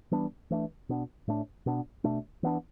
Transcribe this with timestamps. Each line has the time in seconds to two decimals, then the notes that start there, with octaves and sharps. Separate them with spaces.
0.11 E3 G3 B3 D4
0.50 E3 A3 D4
0.89 B2 B3 D4
1.28 A2 A3 D4
1.66 B2 B3 D4
2.04 B2 A3 D4
2.43 E3 B3 D4